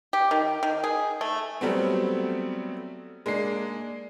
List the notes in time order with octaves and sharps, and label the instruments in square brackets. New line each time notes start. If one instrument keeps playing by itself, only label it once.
[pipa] G4
D#3
D#3
G#4
A3
[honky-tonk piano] F#3 G3 A3 B3 C4
G#3 A#3 D4 C7